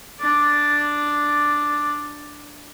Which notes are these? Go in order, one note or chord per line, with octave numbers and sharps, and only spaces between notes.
D4 D5